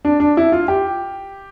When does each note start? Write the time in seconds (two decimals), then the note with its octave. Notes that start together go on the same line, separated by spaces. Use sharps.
0.05 D4
0.20 D4
0.37 E4
0.52 F4
0.68 G4